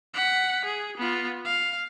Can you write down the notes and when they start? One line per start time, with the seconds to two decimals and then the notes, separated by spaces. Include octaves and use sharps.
0.14 F#5 B6
0.65 G#4
0.98 B3 F4
1.45 F5